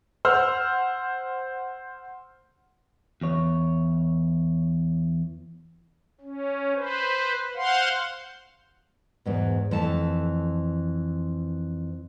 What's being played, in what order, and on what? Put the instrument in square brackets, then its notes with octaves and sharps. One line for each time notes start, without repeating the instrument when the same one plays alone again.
[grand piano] C5 F#5 E6 F6
[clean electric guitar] E2 C#5
[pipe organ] C#4
B4 C5
C5 F5 F#5 C6
[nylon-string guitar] E2 G#2 B2
F2 E3 A3 A5